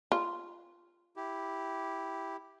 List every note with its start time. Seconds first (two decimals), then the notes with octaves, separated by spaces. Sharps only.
0.12 F4
1.16 E4 G4